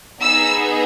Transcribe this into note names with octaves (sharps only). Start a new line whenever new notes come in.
B3 D#4 G#4 E6